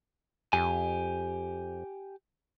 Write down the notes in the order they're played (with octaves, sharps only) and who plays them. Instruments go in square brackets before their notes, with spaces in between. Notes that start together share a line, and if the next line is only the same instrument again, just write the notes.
[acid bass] F2 [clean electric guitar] G4 G#5